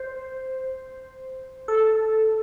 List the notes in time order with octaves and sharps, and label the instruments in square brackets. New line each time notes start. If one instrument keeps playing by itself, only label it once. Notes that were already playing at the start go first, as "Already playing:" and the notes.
Already playing: [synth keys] C5
A4